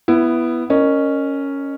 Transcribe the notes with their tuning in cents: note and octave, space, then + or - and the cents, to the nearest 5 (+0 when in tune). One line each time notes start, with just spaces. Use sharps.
B3 +0 E4 +15
C#4 +0 A#4 -10 D#5 -30